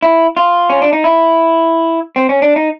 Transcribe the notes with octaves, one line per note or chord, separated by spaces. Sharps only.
E4
F4
C#4
D4
D#4
E4
C4
C#4
D4
D#4